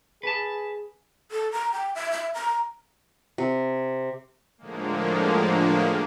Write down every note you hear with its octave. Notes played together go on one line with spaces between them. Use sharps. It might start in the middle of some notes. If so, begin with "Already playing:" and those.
G#4 B4 A5
A4
A#5
G5
E5
E5
A#5
C3
A2 D3 F3 G#3 A#3